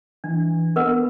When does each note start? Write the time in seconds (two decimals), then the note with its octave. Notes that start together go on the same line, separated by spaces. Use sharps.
0.24 E3 D4
0.76 B3 A#4 B4 F#5